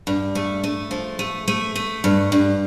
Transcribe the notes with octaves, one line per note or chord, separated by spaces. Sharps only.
G2
A3
A3
F3
A3
A3
A3
G2
G2